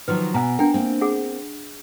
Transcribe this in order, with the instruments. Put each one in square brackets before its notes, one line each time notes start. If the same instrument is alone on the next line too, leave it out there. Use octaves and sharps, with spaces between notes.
[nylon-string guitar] D#3 F3 F#3 [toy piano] B4
[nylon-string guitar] B2 [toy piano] G#5 A#5
[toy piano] D4 G5 [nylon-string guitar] A#4
[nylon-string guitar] A#3 C4
[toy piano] G#4 F#5